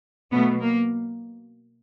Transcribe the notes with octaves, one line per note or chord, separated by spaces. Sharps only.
B2 F#3 A3 B3
A#3